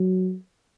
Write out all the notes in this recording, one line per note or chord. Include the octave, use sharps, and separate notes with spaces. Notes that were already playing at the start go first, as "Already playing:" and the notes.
Already playing: F#3